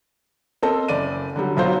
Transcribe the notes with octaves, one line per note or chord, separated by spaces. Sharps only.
C4 A4 A#4 D#5 A5
F#1 D5 D#7
D3 F#3 G3
B1 F#3 F4 C5